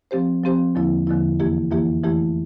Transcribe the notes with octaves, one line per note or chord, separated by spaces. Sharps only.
F3 C4 G4 C5
F3 C4 G4 C5
E2 D3 F3 A#3 E4
E2 D3 F3 A#3 E4
F2 E3 A#3 E4 G4
F2 E3 A#3 E4 G4
F2 E3 A3 E4 G4